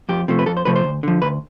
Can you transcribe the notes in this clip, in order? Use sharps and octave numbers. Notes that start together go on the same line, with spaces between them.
F2 G4
C3 F3 A3
B4
F2 A4
C5
C3 F3 A3 B4
C5
D2
D3 F3
D2 B4